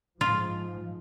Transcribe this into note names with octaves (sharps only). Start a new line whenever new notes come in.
G#2 F3 F4